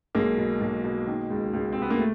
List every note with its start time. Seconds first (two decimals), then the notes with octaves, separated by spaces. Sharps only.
0.15 B1 G#3 A#3
0.38 B2
0.61 B1
0.84 B2
1.07 D#3
1.30 C#2
1.53 C#2
1.72 C3 C4
1.82 B3
1.90 A#3
1.99 A3